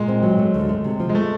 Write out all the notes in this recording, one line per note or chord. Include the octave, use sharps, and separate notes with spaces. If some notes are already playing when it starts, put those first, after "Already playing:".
Already playing: A#2 G#3
C4
F#3
A3
D2
A3
C3
F3
G#3
A3